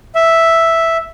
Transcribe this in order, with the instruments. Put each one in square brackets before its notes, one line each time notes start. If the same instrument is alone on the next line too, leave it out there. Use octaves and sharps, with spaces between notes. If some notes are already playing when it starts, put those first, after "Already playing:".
[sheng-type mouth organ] E5